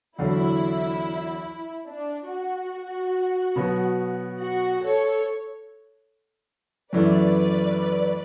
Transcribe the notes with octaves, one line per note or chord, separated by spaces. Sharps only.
E2 D3 F#3 E4
D4
F#4
B2 F#3 B3
F#4
A4 C#5
F#2 E3 A3 B4 D5